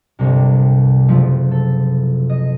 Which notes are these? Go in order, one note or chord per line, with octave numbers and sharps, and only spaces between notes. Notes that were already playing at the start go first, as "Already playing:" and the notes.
G1 C2 C3
F#1 F3 A3
A4
D#5